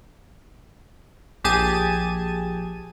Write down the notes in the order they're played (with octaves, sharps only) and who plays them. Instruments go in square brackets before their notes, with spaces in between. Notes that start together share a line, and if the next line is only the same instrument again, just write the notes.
[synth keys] A#1 G4 G#4 A5 G#6 D#7